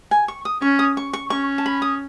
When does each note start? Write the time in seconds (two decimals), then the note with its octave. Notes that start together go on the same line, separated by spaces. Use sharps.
0.11 G#5
0.28 C#6
0.45 D#6
0.62 C#4 C#6
0.79 D#6
0.97 C#6
1.13 C#6
1.30 C#4 C#6
1.58 A5
1.66 B5
1.82 D#6